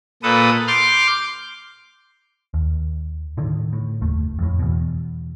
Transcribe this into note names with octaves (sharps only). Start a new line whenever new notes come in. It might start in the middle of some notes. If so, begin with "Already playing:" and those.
A#2 A4 B4 D#6
C6 D6 F6 G6
D#2
A2 D3 D#3
A2
F#1 D#2 A3
F2 A2
E2 B2